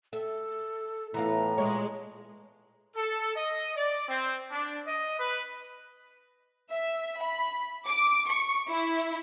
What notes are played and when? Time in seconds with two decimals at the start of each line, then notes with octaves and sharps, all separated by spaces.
0.13 A4 E5
1.14 A2 E3 B3 F4 A#5
1.58 A#2 G#3 C#5
2.96 A4
3.35 D#5
3.76 D5
4.08 C4
4.51 D4
4.86 D#5
5.19 B4
6.70 E5
7.20 B5
7.86 D6
8.27 C#6
8.67 E4